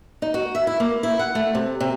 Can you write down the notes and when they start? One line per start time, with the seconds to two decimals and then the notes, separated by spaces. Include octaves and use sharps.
0.22 D#4
0.34 F#4
0.55 E5
0.67 E4
0.80 A#3
1.03 E4
1.19 F#5
1.35 A3
1.55 C3
1.80 C3